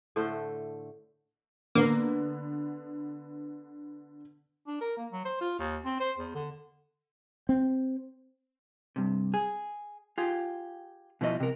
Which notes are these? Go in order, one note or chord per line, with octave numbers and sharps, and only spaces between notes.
A2 D3 A3 C5
D3 A#3 B3
D4
A#4
A#3
F#3
C5
F4
D#2
C4
C5
E2
D3
C4
G2 C3
G#4
F4 G4 G#4
B2 F3 E4 C5 D#5
C3 A#4